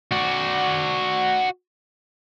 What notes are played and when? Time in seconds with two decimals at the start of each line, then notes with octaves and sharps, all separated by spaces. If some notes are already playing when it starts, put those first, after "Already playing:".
0.12 F#4 D5